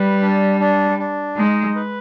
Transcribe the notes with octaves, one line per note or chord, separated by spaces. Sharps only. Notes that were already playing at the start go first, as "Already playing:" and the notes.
Already playing: G3 B4
D4
D4
D4
G#3 D#4
B4